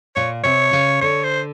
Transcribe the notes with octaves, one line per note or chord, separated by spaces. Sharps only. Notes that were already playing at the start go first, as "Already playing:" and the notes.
A#2 C#5
C3 C#5
C#3
D3 C#5
C5